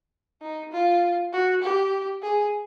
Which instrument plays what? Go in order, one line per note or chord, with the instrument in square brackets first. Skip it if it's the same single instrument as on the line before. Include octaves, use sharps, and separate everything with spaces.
[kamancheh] D#4
F4
F#4
G4
G#4